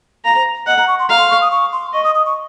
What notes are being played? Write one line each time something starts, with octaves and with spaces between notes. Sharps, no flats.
F5 A#5
C5
D#5 F#5
A#5
C#6
C6
F5 A#5
C6
C#6
D#6
C#6
C6
D#5 C#6
D#6
D#6
C#6